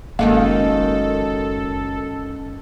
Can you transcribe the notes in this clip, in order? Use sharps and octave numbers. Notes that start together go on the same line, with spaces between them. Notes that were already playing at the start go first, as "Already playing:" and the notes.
F#1 F#2 D#3 G#3 A#3 A4